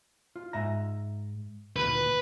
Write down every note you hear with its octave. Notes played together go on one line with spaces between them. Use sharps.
F4
G#2 E5 A#5
D2 A#2 D#3 B4